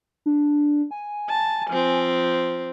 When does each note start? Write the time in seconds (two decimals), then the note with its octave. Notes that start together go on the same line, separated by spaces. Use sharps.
0.26 D4
0.91 G#5
1.29 A5
1.69 F3 C4